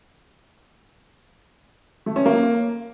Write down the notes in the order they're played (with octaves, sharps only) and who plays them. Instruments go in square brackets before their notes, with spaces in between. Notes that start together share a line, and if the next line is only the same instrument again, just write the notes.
[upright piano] A3
C#4
A#3